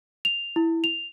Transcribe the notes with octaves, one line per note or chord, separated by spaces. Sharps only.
F7
E4
F7